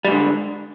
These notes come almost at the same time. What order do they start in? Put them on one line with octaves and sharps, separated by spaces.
G3 G#2 D3